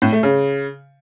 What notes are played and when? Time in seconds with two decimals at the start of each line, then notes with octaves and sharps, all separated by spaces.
0.02 A2
0.12 A3
0.23 C#3